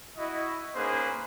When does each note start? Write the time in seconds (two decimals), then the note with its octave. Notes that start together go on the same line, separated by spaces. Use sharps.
0.17 E4 F#4 D#5
0.75 A#3 C#4 D#4 G#4 B4 C5